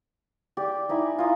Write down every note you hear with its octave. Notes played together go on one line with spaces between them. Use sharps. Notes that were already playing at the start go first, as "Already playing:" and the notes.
G4 D5
D#4 E4 G#5 B5
D#4 F4